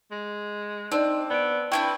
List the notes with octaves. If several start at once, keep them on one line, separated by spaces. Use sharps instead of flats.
G#3
C4 D4 D#4 D5 D#5
B3 D5 D7
C4 D4 E4 B4 G5 C#6